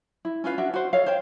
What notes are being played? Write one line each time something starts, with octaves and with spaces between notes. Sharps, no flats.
E4
C#4 F4 B4 F5
D4 F#4 E5
F#4 C5
A4 C#5 F5
C5 C#5 F5 G5